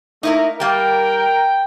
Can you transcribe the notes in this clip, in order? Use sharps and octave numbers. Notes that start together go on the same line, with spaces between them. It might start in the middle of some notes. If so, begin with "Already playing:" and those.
A3 A#3 D#4 E4 A#4
G3 A#3 A#4 G5